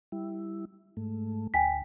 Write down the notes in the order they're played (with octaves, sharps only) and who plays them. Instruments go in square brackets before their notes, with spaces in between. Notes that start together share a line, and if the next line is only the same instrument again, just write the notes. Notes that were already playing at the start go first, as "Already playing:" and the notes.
[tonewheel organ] G3 E4
G#2 A3
[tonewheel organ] D2 [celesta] G5 G#5 B6